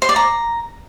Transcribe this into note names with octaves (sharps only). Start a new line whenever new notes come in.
C5
D5
A#5